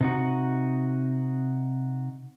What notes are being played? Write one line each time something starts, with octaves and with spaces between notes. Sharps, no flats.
C3 D#4 F#4